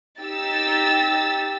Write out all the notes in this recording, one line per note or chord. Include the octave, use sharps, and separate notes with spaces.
D#4 G4 E6 A6